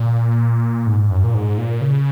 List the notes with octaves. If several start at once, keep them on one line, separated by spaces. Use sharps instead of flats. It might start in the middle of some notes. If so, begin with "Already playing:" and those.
Already playing: A#2
G#2
F#2
A#2
G#2
A#2
C#3